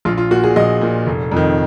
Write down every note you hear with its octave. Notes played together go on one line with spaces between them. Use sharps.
A#1 F4
F4
A#2 F#4
G#4
A#1 D#5
A#2
F1
F2 D#3